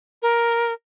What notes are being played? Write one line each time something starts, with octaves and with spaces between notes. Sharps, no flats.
A#4